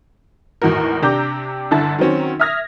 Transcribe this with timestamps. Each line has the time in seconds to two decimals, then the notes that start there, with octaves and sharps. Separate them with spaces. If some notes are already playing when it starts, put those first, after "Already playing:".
0.62 G#1 E2 A2 F#4 A#4
1.02 C3 D4 G4 A#5 D6 G6
1.71 G1 D3 E4 A5 A6
1.99 D#3 F#3 C4 C#4
2.40 E5 D#6 F6 G#6 A#6